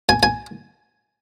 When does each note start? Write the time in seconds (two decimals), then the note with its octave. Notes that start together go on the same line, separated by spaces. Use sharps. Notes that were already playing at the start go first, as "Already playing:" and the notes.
0.09 G#5
0.23 G#5